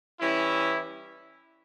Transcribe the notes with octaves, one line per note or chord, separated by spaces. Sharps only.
E3 G3 C#4 E4